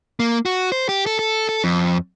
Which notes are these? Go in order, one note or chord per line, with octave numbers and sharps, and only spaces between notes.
A#3
F#4
C5
G4
A4
A4
A4
F2